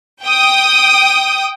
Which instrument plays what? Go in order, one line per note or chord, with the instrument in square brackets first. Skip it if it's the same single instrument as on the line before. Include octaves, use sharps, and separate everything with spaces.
[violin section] G5 D#6